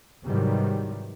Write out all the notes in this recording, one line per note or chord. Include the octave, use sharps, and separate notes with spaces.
G#2 C3 D#3 E3 F#3 G3